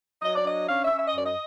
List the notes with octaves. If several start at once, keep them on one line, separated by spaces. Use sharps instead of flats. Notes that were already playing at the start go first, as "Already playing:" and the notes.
F#3 D#5
D5
D4 D#5
C#4 F5
E5
C#4
E5
D#5
F#2 D5
D#5